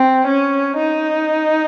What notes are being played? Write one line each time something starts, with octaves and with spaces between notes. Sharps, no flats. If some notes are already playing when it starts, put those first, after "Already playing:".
Already playing: C4
C#4
D#4